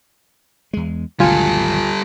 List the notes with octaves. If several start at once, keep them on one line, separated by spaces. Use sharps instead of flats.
E2 G#3
G#1 D2 B2 F#3 G3 F4 A4 G#5